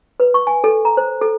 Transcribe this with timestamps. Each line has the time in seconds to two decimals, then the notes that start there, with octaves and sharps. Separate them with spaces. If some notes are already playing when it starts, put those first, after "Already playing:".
0.20 B4
0.34 C#6
0.47 G#5
0.64 A4
0.85 A#5
0.97 C5
1.21 A4